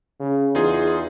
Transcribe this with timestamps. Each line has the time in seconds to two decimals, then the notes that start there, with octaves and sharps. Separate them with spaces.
0.20 C#3
0.55 E2 D#4 F4 G#4